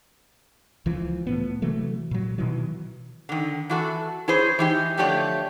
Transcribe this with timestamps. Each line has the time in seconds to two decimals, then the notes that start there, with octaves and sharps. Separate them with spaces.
0.86 C#2 E3 F3
1.27 A2 B3
1.62 C3 E3 F#3 A3
2.11 A#2 F#3
2.38 B2 D#3 E3 F#3
3.29 D3 D#3
3.70 E3 F#4 A4
4.28 E4 G#4 C5 C#5
4.59 E3 D#4 G4
4.97 D3 F3 A3 G4 C#5 D5